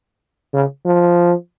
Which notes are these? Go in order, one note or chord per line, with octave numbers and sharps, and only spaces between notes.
C#3
F3